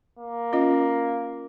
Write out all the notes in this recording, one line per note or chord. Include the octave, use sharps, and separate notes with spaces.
A#3
C#4 F4 D#5